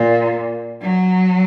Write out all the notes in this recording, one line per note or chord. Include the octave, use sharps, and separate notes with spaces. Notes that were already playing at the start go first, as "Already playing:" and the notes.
Already playing: A#2
F#3